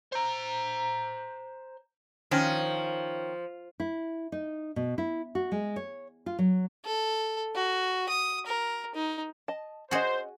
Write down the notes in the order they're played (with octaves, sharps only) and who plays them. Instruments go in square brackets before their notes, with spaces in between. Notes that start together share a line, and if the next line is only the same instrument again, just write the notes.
[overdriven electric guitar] C5 A#5
[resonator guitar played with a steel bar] D#3 C#4 [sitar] F3
[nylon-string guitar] E4
D#4
B2
E4
F#4
G#3
C#5
F4
F#3
[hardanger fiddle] A4
F#4
D#6
A#4
D#4
[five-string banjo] D#5 A5
[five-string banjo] C#4 D#5 [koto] F#4 G#4 [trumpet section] C5